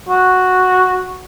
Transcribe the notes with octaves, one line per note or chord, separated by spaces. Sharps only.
F#4